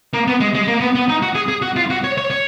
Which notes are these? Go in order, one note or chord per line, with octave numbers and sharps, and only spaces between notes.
A#3
B3
G#3
G#3
A#3
B3
B3
D#4
F#4
G#4
G#4
F#4
F4
F#4
C#5
C#5
C#5